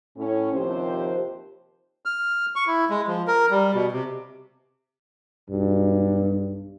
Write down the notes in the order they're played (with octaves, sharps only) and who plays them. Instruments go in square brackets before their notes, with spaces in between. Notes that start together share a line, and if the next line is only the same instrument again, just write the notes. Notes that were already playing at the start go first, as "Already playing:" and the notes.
[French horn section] A2 C#4
D#2 C3 F3 G4 C5
[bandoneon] F6
C#6
E4
G#3
F3
A#4
G3
B2
C3
[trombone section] B1 G2